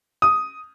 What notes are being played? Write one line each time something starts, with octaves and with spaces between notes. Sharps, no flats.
D#6